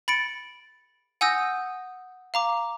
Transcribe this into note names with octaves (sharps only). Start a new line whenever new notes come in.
B5 A6 C#7 D7
F#5 G#5 D#6 E6 G6 A#6
F5 A#5 D6